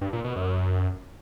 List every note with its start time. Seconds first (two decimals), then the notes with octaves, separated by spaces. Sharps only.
0.01 G2
0.13 A#2
0.24 B2
0.36 F#2